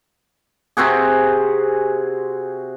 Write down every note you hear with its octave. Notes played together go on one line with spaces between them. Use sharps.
C3 C4 F#4 G#4